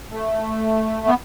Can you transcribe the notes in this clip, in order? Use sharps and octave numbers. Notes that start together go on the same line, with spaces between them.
A3
B3